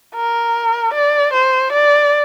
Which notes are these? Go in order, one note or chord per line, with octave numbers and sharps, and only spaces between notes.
A#4
D5
C5
D5